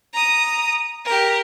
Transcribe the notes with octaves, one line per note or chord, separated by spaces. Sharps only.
A#5 D#6
G4 A#4